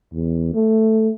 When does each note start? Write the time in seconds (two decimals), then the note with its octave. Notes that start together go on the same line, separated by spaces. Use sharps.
0.13 E2
0.54 A3